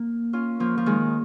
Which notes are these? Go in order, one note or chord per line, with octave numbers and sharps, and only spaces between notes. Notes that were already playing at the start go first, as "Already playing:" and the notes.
Already playing: A#3
C#4 F4
F3 A#3
F3
D#3 G#3